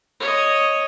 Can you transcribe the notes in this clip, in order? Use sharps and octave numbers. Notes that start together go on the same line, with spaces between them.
C#5 D#5